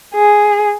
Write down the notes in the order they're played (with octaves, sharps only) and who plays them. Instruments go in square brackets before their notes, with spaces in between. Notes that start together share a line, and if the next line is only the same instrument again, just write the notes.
[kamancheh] G#4